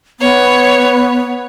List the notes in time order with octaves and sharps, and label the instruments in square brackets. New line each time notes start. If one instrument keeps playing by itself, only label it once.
[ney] B3 [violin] C#5